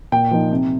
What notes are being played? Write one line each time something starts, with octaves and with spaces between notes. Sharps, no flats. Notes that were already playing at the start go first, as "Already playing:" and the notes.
A#2 G5
F3 A#3 D#4
C3